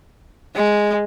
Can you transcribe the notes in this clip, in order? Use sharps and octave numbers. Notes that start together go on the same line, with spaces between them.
G#3